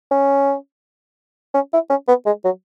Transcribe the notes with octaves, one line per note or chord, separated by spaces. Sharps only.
C#4
C#4
E4
C#4
B3
G#3
F#3